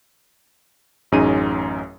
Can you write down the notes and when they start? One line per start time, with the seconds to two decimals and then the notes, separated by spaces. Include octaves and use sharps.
1.12 A1 F#2 C#4 D#4 G#4 D#7